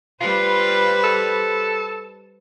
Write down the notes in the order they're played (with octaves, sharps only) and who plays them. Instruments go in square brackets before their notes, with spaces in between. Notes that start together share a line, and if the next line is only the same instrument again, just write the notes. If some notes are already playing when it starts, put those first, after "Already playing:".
[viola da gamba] G3 B4 C5 [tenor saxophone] F4
[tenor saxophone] A4